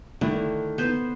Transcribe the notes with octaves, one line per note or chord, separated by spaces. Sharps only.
D3 D#3 A3 E4
B3 C5